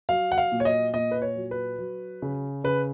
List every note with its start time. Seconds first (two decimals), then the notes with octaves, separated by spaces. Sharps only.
0.09 F#3 F5
0.32 F#5
0.38 F5
0.52 A#2
0.60 C#5
0.65 D#5
0.94 A#2 D#5
1.11 B4
1.22 C#5
1.36 F#3
1.51 B4
1.79 F#3
2.22 C#3
2.64 C#3 B4